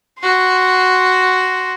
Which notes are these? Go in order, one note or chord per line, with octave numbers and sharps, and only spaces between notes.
F#4 C6